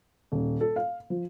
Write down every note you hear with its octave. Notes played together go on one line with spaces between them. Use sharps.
D#1
A4
F5
F3